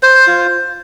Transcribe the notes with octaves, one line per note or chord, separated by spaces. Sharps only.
C5
F4